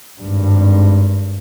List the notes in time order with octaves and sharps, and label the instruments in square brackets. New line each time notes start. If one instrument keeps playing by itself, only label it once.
[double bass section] G#1 G2